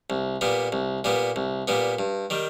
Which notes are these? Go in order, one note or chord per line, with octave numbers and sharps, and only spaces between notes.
C2
A#2 G3 B3
C2
A#2 G3 B3
C2
A#2 G3 B3
G2
D#3 G3